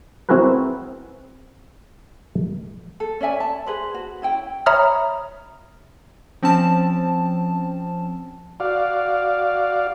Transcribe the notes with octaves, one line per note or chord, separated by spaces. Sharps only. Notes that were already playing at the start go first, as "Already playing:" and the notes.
C4 E4 F#4 G#4 A#4 B4
A4
C#4 D5 E5 G#5
A5
G#4 B4 C5
F#4
C#4 E4 G5
C#5 E5 A#5 B5 D#6 F6
F3 C4 C#4 A5
F#4 D5 F5